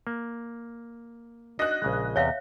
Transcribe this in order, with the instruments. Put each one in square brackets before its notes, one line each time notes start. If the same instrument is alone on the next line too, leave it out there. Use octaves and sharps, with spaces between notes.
[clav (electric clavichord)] A#3
[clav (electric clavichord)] D4 D#4 F#4 [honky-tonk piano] D#5 F#6
[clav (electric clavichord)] A#1 C#3 G#3
[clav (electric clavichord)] E2 C3 [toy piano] C#5 E5 F5